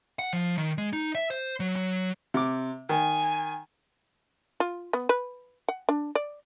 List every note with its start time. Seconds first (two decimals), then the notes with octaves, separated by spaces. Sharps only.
0.19 F#5
0.33 F3
0.58 D#3
0.78 G#3
0.93 D#4
1.15 E5
1.31 C5
1.60 F#3
1.76 F#3
2.34 C3 D6
2.89 D#3 G#5
4.60 F4
4.93 B3
5.09 B4
5.68 F#5
5.89 D4
6.15 D5